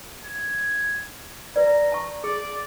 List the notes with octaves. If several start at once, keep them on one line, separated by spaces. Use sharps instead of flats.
G#6
B4 D5 A#5
A5 C#6
G#4 D5